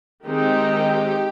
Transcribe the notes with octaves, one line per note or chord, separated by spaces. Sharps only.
D#3 G#3 C4 D#4 G4